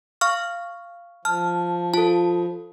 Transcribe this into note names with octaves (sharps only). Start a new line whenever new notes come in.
F5 C#6 F6
F3 A5 F6
F4 A4 A5